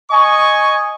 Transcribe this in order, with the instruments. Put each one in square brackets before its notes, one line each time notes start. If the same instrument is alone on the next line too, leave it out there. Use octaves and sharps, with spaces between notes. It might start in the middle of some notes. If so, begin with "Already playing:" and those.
[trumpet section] D#5 G#5 C#6